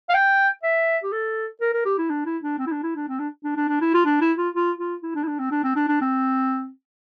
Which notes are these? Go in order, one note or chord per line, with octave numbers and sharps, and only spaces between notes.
F5
G5
E5
G4
A4
A#4
A#4
G4
E4
D4
E4
D4
C4
E4
D4
E4
D4
C4
D4
D4
D4
D4
E4
F4
D4
E4
F4
F4
F4
E4
D4
E4
D4
C4
D4
C4
D4
D4
C4